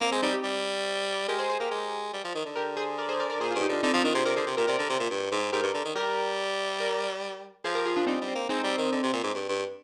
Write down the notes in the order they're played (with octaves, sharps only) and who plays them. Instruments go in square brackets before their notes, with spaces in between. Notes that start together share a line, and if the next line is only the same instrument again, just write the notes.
[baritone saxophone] A#3 [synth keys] C4
[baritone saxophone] G#3 [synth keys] C4
[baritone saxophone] G3 [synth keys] C4 D#4
[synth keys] D#4 G4
[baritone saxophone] G3
[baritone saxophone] G#3 [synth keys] G4 A#4
[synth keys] G#4 C5
G#4 C5
[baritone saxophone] A#3 [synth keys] G4 A#4
[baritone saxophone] G#3
G3
F3
D#3
D3
[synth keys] G4 A#4
G#4 C5
A#4 D5
G#4 C5
A#4 D5
A#4 D5
[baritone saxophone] A#2 [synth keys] G#4 C5
[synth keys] F4 G#4
[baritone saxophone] G2
[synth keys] D#4 G4
[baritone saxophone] D3 [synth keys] D4 F4
[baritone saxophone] D3 [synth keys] C4 D#4
[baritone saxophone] F3 [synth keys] C4 D#4
[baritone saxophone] D#3 [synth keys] D4 F4
[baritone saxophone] C3 [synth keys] G#4 C5
[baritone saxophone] C3 [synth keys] A#4 D5
[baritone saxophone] D3 [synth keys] G#4 C5
[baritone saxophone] C3
[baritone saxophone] A#2 [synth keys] G4 A#4
[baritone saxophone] C3 [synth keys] A#4 D5
[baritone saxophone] D3
C3
A#2
G2
G#2
[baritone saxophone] G#2 [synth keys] G4 A#4
[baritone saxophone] G2
D3
D#3
[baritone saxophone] G3 [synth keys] G4 A#4
[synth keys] A#4 D5
[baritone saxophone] F3 [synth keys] G#4 C5
[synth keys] G4 A#4
F4 G#4
D4 F4
[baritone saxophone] G3 [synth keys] C4 D#4
[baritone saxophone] G3
[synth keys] C4
[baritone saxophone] A#3
[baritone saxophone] G#3 [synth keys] C4 D#4
[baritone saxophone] G3
D#3
D3
C3
A#2
G#2
G2
G2